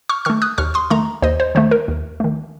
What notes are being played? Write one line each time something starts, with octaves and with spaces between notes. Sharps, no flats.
C#6 F6
D#3 A3 C#6 F6
D#6 F#6
D#2 C#6 F6
C6 D#6
D#3 A3 A#5 C#6
D#2 C5 D#5
C5
D#3 A3 C5
A#4
D#2
D#3 A3